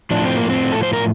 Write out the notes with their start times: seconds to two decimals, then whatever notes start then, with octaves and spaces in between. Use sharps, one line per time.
0.11 A2 F3 D4
0.24 C4
0.37 A#3
0.50 C4
0.72 A4
0.83 C5
0.93 A#4